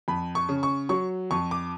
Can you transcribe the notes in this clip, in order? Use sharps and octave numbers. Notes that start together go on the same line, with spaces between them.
F2 B5
C#6
C#3
C#6
F#3 C#6
F2 C#6
D6